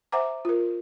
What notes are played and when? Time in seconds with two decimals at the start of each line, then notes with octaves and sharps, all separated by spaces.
0.12 C5 E5 F#5 G#5 A#5 D6
0.45 F4 A#4